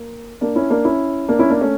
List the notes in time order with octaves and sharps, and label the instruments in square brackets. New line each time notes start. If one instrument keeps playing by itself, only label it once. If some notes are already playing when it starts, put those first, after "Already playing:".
Already playing: [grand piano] A#3
A#3 D4
C#4 E4
A#3 D4
C#4 E4
A#3 D4
C#4 E4
A#3 D4
A3 C#4